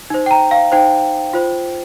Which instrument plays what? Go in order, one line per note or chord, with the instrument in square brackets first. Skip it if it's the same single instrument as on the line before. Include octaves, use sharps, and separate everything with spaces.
[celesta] D#4 C5
G5
A#5
F5
D#4 C5 G5
F4 C5